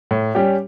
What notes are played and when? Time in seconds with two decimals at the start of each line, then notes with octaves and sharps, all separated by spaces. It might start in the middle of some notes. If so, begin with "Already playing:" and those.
0.11 A2
0.35 G3 C#4 G4